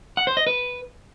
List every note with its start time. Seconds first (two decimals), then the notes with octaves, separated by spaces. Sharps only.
0.17 F#5
0.27 C5
0.37 D#5
0.47 B4